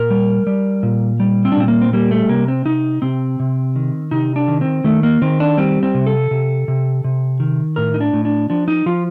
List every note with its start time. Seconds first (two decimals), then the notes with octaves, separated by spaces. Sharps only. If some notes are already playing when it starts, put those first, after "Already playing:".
Already playing: A#2 A#4
0.10 G3
0.47 G3
0.83 A#2
1.20 G3
1.45 C4
1.52 D4
1.57 A#2 C4
1.68 A#3
1.82 C4
1.93 G3 A#3
2.11 A3
2.29 C3 A#3
2.48 C4
2.65 C3 D#4
3.02 C3 C4
3.40 C3
3.76 D#3
4.11 C3 D#4
4.36 D4
4.48 D#3
4.61 C4
4.84 D#3 A3
5.03 A#3
5.22 D#3 C4
5.40 D4
5.58 G3 C4
5.83 C4
5.94 C3
6.06 A4
6.31 C3
6.68 C3
7.04 C3
7.40 D#3
7.76 A2 A#4
7.94 D#4
8.01 D4
8.13 A2
8.25 D4
8.50 F3 D4
8.68 D#4
8.86 F3 F4